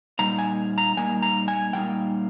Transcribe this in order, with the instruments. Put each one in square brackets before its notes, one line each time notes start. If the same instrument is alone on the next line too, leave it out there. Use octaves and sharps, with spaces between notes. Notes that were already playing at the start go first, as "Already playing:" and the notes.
[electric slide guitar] A#2 G3 A#3 D#4 A#5
G#5
A#5
A#2 G3 A#3 D#4 G#5
A#5
G#5
A#2 G3 A#3 D#4 G5